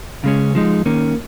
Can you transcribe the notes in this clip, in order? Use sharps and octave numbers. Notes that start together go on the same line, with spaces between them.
C#3 G#3 C#4
F3 G#3 D#4
D#3 A#3 C#4